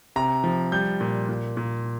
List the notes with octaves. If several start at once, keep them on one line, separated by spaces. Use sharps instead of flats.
C3 A#5
F3
G3 G6
A#2
A#2
A#2